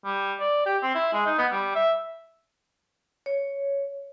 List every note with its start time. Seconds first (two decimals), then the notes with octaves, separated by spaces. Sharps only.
0.05 G3
0.40 D5
0.66 G4
0.82 C4
0.94 E4
1.13 G#3
1.26 D#4
1.38 B3
1.52 G3
1.75 E5
3.26 C#5